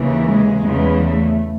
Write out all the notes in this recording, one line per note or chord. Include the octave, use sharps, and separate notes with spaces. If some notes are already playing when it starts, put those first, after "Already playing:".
Already playing: D#2 C#3 E3
G#3
E2 C#3 E3
A3